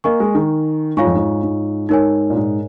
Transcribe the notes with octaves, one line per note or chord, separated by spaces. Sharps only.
A#3 A#4 D#5 G#5 C#6
G#3
D#3
G#2 F4 C#5 F5 G#5 C#6
F2
G#2
G#2
G#2 D#4 A#4 C#5 G#5
A#2
G#2